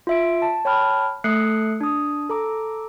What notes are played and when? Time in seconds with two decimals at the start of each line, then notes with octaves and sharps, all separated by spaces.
0.07 F4 E5 D7
0.42 A5
0.65 C#5 G5 A5 B5 F6
1.24 A3 A4 D#6 F#6 C7 C#7
1.81 D4 D#6
2.30 A4 A#5 D6